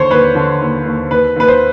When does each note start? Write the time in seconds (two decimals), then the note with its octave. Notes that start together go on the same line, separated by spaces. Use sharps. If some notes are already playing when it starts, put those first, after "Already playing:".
Already playing: D#2 D3 C5 C#5
0.10 D#2 B4
0.35 D3
0.61 D#2
0.86 D#2
1.11 D#2 B4
1.36 D#2 B4
1.48 C5